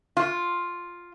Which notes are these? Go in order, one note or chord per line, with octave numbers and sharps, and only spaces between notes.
F4